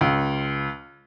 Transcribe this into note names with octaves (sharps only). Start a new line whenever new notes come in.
C#2